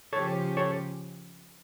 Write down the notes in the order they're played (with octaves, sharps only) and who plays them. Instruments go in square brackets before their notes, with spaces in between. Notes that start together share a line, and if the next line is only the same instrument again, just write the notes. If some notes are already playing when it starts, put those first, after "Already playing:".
[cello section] C#3 F3 C#4 G4 [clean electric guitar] A4 C#5
[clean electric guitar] A4 C#5